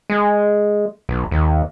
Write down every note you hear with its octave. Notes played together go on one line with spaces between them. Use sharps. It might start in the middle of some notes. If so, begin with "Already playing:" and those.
G#3
B1
D#2